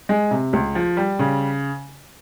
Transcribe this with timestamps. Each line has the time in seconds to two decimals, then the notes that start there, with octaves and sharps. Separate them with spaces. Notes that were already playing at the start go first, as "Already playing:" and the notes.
0.09 G#3
0.31 C3
0.53 C#2
0.75 F3
0.97 G3
1.19 C#3